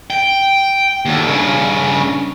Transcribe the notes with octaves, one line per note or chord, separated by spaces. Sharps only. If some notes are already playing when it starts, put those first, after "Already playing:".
G5
D#2 D3
G2 C#3